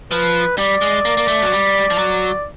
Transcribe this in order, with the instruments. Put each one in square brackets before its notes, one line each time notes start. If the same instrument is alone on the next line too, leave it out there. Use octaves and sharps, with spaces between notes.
[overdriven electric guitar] F3 [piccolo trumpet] B4
[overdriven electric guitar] G3 [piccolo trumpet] D5
[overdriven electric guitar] G#3
A#3
A#3
A3
F#3
G3
F3
F#3